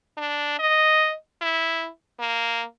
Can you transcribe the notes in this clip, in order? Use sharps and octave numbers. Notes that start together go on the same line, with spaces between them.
D4
D#5
E4
A#3